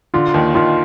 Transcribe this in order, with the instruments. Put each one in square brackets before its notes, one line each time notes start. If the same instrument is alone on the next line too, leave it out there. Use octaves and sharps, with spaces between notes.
[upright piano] D3 [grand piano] F4
[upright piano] D#2 D#3
[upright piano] D#2 D#3 [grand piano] F4